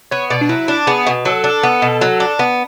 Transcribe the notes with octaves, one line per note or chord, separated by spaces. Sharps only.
B3 C#5
B2 D5
D4
F#3 E4
D4
B3 G#4
B2
F#3 A4
D4
B3
B2
F#3
D4
B3